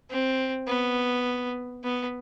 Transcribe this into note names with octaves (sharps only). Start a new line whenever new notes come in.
C4
B3
B3